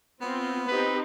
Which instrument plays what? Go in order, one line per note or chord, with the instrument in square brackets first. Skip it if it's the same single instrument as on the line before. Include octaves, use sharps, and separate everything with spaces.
[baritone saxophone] B3 [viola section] C4 F4
[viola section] C4 D#4 G4 [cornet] B4